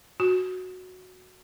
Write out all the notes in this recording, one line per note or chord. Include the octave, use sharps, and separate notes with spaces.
F#4